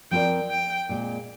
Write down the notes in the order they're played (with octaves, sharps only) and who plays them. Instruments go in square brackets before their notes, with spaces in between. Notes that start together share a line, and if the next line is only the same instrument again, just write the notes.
[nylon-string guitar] F3 C4 F4 A#4 D5 [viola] G5
[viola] G5
[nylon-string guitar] A#2 G#3 C4